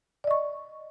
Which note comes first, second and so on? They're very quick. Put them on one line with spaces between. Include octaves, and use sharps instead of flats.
D5 D#5 C#6